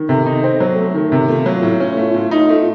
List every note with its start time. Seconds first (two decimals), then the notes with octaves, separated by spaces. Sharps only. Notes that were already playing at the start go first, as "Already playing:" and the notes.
Already playing: D#3
0.08 C3 A4
0.26 D#4
0.44 C4
0.60 F#3
0.77 A3
0.95 D#3
1.12 C3
1.28 A3 F4
1.46 F#3
1.63 A2
1.80 C#4
1.97 A3
2.14 A2
2.31 D#4
2.49 A3